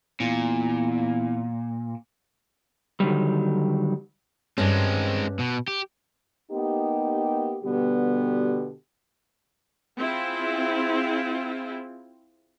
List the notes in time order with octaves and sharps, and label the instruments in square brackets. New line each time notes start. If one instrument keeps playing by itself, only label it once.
[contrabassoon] E2 [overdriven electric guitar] A#2
[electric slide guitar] D3 D#3 F#3 G3
[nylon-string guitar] G2 C#4 [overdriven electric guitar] G#3 C4
[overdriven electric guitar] B2
G4
[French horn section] A#3 B3 D#4 G4
B2 D3 G3 B3 F#4 G4
[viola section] C4 E4 F4 G#4